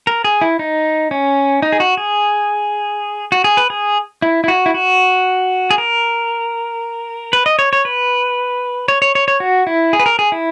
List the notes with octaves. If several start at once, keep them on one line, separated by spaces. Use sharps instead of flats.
A#4
G#4
E4
D#4
C#4
D#4
G#4
F#4
G#4
F#4
G#4
B4
G#4
E4
E4
F#4
E4
F#4
G#4
A#4
B4
D#5
C#5
C#5
B4
C#5
C#5
C#5
C#5
F#4
E4
G#4
B4
A#4
G#4
E4